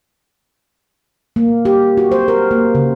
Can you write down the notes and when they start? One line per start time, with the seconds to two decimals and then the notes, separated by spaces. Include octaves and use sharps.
1.36 A#3
1.65 G4
1.97 F#4
2.12 C5
2.28 A#4
2.51 A#3
2.75 C#3